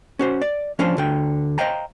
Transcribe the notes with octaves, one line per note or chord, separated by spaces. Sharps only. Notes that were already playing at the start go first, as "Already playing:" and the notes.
C#4 F#4 C5
D5
F3 C#4 D4 F4 C5
D2 D3 G5
C5 D#5 F5 G5 A#5